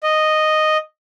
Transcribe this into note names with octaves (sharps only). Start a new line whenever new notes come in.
D#5